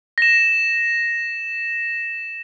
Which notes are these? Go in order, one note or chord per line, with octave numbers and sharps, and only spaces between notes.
A#6 E7